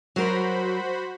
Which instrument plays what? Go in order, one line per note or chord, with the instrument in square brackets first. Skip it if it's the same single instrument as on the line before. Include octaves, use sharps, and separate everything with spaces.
[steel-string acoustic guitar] F#3 A#4 [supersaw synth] F#4 C5 B5